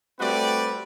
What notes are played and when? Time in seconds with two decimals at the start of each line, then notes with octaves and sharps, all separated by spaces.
0.20 G3 A3 C4 F#4 B4 D5